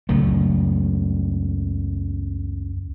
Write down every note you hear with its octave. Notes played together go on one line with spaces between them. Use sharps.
C#2 F#2 A3